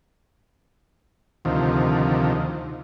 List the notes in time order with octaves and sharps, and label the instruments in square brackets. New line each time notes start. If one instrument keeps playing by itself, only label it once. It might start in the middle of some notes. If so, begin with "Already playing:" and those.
[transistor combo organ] D2 C3 D#3 F3